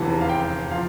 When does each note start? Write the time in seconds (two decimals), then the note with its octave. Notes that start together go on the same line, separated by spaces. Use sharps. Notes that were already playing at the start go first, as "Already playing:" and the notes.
Already playing: F1 E2 C3 E3 A5
0.21 F5
0.29 G5
0.71 F3 F5